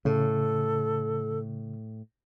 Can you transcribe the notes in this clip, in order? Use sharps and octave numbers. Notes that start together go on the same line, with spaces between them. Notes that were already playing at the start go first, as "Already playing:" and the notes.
A2 C#3 A4